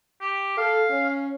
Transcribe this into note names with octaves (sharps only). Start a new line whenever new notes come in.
G4
A4 F5
C#4